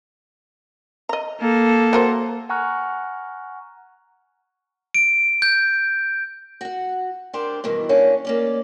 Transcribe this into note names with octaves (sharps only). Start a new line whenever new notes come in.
D#5 A#5
A#3 A4
F#3 A#4 C5
F#5 G#5 A#5 C#6 F6 F#6
D7
G6
F#4 F#5
D4 G4 A#4 C5 D5
G2 B2 D#3 E3
G2 A#3 C#4 D4
A#3 C#4 D5